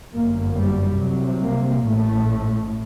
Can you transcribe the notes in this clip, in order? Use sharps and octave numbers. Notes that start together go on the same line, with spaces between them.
G1 F#2 A#3
G3
C2 C3 F#3
A#3
A1 A2 A3